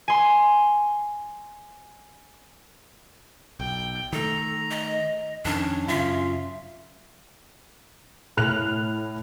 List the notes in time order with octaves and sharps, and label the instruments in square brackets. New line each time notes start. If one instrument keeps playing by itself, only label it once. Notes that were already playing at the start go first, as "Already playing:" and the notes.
[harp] G#5 C6
[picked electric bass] B1 [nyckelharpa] G5
[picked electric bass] D#3 A3 [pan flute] A4 [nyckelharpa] A#5
[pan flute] D#5
[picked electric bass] F2 D#3 [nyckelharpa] C#4 [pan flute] D4
[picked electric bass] F#2 C#3 [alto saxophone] F4 [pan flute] E5
[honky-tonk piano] A2 F6 F#6 F7